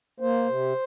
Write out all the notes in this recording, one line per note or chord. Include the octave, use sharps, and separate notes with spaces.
A#3 C5
C3